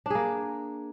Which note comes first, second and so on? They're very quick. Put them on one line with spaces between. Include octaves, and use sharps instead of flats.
D4 G#4 A#3